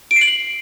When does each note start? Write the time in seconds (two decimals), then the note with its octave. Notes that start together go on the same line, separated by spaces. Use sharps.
0.11 D7
0.16 C7
0.21 F#7